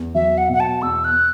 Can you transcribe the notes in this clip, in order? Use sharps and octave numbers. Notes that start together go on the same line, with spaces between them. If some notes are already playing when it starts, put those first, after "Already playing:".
Already playing: E2
F#3 E5
F#5
B2 F#5
A5
E2 E6
F#6